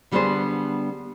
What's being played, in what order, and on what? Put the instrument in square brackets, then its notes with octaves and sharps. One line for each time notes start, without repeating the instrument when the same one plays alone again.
[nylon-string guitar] D3 G3 B3 D4 G#4 C5